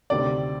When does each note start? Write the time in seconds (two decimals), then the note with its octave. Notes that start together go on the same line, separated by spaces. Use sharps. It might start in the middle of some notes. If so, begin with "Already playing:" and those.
0.10 D2 C3 D#3 D5